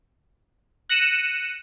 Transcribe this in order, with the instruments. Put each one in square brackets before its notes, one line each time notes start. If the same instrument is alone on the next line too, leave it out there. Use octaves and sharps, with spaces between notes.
[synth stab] F#6 A#6 C#7 D#7 E7